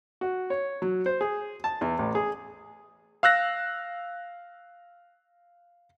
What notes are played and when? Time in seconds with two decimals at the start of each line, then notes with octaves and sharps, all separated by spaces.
0.21 F#4
0.50 C#5
0.82 F#3
1.06 C5
1.21 G#4
1.64 A5
1.81 E2
1.99 A1
2.15 G#4
3.23 F5 E6 F#6 A#6